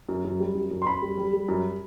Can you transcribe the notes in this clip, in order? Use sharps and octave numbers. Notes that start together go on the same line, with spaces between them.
F#2
F#2
G3
F#2
F#2
C6
F#2 B5
G3
G3
G3
F#2